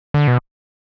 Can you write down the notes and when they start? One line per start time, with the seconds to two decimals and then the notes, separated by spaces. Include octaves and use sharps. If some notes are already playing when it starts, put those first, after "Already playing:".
0.14 D3
0.27 B2